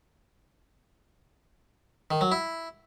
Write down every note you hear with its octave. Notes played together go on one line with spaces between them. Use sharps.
D#3
F#3
E4